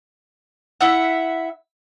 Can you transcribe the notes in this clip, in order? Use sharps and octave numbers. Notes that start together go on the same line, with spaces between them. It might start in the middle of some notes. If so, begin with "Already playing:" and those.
E4 E5 F#5